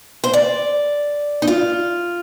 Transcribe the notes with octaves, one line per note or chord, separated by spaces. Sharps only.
C5
D5
D#4
F4